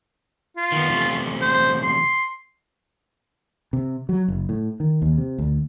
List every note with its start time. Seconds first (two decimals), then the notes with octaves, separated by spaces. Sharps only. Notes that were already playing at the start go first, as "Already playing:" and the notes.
0.57 F4
0.72 D#3 B3
0.88 E2 C3 A3
1.42 C5
1.83 C6
3.73 C3
4.09 F#3
4.28 F#1
4.49 A2
4.80 D#3
5.02 D#2
5.18 C3
5.38 D2